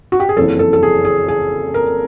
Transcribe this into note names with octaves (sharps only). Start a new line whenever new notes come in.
F#4
G4
G#4
F#1 F2 C#3 E3 A4
A4
A4
G#4
G#4
G#4
A#4